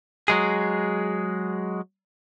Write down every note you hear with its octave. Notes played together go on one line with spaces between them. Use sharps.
F#3 G#3 G#4